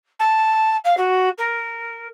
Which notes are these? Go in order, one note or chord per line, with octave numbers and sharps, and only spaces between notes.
A5
F5
F#4
A#4